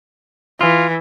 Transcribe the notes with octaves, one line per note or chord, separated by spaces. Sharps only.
E3 F4